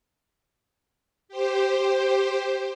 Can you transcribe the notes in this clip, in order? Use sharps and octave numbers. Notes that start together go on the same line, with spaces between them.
G4 C5